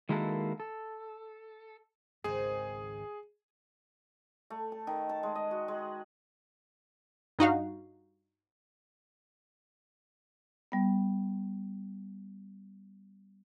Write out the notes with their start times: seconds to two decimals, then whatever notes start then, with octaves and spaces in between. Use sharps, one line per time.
0.09 D#3 G#3 A#3 E4 F#4 A4
0.60 A4
2.24 G#1 C#2 G#2 D#3 C4 G#4
4.50 A3
4.72 A5
4.87 D#3
5.09 A5
5.23 G#3
5.35 D#5
5.51 F#4
5.68 G#3
7.39 G2 D#4 F#4 F5
10.72 G3 B3